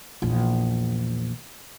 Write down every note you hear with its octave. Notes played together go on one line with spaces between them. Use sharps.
A#1 E2